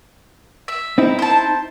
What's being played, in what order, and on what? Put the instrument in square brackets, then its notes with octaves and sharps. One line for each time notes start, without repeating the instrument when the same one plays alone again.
[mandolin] E5
[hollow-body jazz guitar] C4 D#4 E4
[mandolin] C5 A5